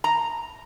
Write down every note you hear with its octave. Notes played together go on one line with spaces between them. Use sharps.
A#5